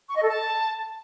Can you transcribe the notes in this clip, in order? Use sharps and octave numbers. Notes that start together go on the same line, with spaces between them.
C#6
D#5
A4
A5